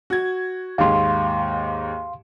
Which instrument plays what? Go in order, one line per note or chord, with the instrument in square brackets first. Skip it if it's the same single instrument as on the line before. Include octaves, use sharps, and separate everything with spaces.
[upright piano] F#4 G#6
[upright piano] D#2 G#2 [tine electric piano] F5 C6